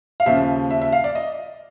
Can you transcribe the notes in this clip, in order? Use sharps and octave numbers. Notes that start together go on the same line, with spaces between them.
F5
D#2 C#3 F3 E5
E5
E5
F5
D5
D#5